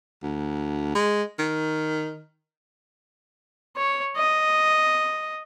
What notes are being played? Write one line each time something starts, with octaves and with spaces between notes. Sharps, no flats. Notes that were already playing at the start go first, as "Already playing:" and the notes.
D2
G#3
D#3
C#5
D#5